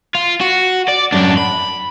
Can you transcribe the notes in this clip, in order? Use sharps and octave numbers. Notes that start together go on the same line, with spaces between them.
F4
F#4
D5
F#2 D4
B5